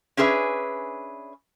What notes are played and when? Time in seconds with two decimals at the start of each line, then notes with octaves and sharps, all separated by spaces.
0.17 C#4 D4 G#4 B4 E5